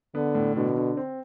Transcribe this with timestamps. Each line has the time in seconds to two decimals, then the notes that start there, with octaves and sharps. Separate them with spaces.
0.15 D3 B3
0.35 A2
0.56 B2 D3
0.76 D3
0.97 C4